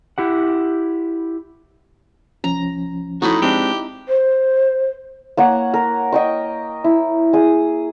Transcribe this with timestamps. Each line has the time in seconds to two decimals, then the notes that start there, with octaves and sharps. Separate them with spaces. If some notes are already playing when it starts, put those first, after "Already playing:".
0.18 E4 G4 F#5
2.44 C2 F3 C#4 A#5
3.22 A2 D#4 E4 F#4
3.42 G#3 C4 D4 G4
4.09 C5
5.37 A#3 C#5 F#5
5.74 A#4
6.12 D#5 G5 C#6
6.84 E4
7.33 G#4 D#6